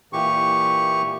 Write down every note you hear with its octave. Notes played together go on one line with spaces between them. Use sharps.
A#2 E3 G4 C#6